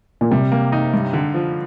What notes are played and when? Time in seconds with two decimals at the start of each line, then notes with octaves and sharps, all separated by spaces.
0.21 A#2
0.31 C3 G3
0.52 A#3
0.72 D#4
0.93 G2
1.13 D3
1.34 F3